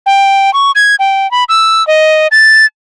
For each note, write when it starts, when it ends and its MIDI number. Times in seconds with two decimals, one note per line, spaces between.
0.06 0.53 79
0.54 0.71 85
0.75 0.95 92
0.99 1.29 79
1.31 1.44 83
1.49 1.85 88
1.87 2.27 75
2.32 2.66 93